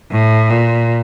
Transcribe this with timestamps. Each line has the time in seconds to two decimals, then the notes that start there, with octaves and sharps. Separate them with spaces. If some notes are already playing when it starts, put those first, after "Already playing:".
0.12 A2
0.50 A#2